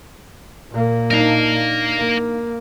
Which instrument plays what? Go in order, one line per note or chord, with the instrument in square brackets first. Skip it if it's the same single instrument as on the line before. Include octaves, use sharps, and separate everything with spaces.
[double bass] A#2 A#3
[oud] D4 D#4 [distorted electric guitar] A#4 F5
[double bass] A#3